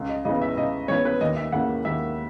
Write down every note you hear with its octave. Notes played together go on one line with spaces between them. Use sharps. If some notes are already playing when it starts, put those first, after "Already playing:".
Already playing: C#2
D#5
C#3 E3 B3 D#5
E5
C#2 D#5
C#3 E3 B3 C#5
B4
D#2 D#5
E5
C#3 E3 A#3 F#5
D#2 E5